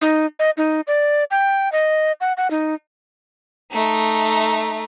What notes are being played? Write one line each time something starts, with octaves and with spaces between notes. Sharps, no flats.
D#4
D#5
D#4
D5
G5
D#5
F#5
F#5
D#4
A3 D#4